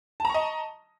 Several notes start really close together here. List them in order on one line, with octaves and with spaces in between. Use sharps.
A5 A#5 C#6 D#5